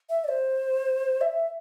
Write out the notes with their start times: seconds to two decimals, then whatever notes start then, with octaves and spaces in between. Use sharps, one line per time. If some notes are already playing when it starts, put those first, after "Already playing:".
0.09 E5
0.24 D5
0.28 C5
1.21 E5